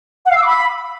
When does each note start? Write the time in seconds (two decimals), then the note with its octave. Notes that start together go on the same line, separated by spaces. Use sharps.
0.25 F#5
0.30 F5
0.35 E6
0.41 D6
0.46 B5